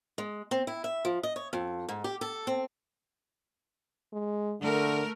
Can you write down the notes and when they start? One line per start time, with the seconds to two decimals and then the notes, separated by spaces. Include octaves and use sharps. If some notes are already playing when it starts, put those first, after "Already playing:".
0.18 G#3
0.51 C4
0.67 E4
0.84 E5
1.05 F3
1.23 D#5
1.36 C#5
1.53 F2
1.89 G#2
2.04 G4
2.21 A4
2.47 C4
4.13 G#3
4.61 D3 A3 A#4